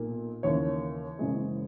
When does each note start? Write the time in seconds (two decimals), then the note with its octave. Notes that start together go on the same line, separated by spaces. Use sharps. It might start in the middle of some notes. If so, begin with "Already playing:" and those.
Already playing: B1 A#2 A#3
0.43 D#2 C#3 E3 A#3 C#5
1.19 F#1 F#2 E3 G#3